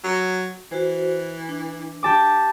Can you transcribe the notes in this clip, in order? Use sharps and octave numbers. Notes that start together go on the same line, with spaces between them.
F#3
E3 F#4 C5
D4
G4 A5 D6